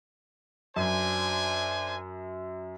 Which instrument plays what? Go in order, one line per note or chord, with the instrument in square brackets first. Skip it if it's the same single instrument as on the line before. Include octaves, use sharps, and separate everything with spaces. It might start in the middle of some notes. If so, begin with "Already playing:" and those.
[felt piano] F#2 [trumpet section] D4 C5 G#5